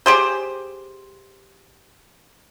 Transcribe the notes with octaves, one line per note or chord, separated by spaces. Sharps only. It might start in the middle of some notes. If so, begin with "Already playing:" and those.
G4 G#4 C5